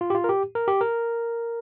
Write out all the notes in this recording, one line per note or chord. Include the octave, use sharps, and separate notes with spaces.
F4
G4
F4
A#4
G4
A#4
G4
A#4